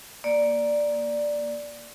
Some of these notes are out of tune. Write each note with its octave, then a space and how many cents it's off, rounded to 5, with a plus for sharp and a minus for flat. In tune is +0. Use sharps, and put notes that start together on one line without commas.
A#3 +0 D5 +0